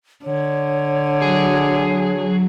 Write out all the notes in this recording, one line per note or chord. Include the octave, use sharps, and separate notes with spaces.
D3 C#5
F#3 G#4